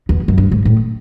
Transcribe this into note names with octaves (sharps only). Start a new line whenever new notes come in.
E2
F#2
G2
G#2
A2